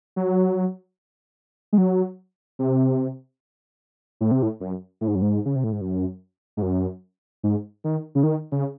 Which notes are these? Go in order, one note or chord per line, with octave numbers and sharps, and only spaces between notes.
F#3
G#3
F#3
C3
A2
C3
A2
F#2
A2
G#2
F#2
G#2
C#3
C3
A2
G#2
F#2
G#2
F#2
G#2
D#3
C#3
D#3
C#3